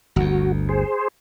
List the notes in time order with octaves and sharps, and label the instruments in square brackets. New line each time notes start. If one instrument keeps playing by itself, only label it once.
[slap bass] G1 D2 [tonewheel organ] F#4
[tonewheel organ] G#4 C5